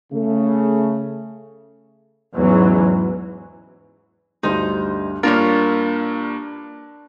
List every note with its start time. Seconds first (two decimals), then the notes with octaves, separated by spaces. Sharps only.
0.13 C#3 A3
2.34 E2 G#2 E3 F#3 C#4
4.43 D2 G2 D#4 C5
5.23 G2 A#3 D4 F4 A#4 C#5